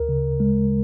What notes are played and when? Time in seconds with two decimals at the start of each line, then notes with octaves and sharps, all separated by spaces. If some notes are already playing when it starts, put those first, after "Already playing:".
Already playing: D2 A#4
0.09 C#3
0.40 G#3